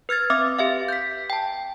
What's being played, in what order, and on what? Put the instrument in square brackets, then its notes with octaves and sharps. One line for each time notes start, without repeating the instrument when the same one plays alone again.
[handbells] B4 F6 G#6 A6
C4 B4 E5 D6 D#6
G4 E5 F5
G6 B6
G5 A5